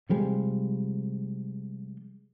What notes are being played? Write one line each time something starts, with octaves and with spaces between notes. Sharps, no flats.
C3 F3 G3 G#3